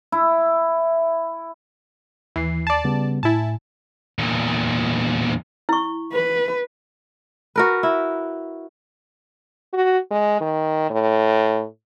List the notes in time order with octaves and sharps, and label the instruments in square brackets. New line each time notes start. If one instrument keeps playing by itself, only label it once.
[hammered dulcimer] E4
[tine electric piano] D#2 C7 [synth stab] E3
[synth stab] D5 A5
[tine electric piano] C#3 G3 B3
[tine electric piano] A2 G#5 [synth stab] E4 A5
[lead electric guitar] E2 A#2
[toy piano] E4 C#6
[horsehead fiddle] B4
[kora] F#4 A#4 B4
E4
[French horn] F#4
G#3
D#3
A2